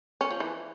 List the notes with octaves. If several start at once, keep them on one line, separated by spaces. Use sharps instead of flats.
C#4
F3
E3